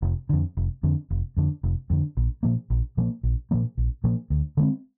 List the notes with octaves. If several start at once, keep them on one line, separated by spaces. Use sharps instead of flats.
F1
F2 D3
F1
F2 D3
F1
F2 D3
F1
F2 D3
A#1
A#2 F3 A#3
A#1
A#2 F3 A#3
A#1
A#2 F3 A#3
A#1
A#2 F3 A#3
D2
D3 G#3 C4